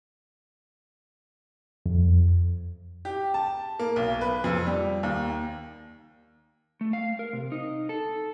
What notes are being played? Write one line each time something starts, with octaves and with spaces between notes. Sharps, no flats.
F2
G4
A5
A#3
B1
B4
F2
G3
D#2
A3
F5
A#4
C3
D#4
A4